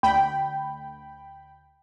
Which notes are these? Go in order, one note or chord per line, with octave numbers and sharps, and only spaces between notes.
D2 G5 B5